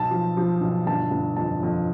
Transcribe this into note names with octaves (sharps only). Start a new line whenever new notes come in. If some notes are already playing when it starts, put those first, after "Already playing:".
Already playing: B1 A5
F3
F3
B1
G1 A5
G1
F2 A5
F2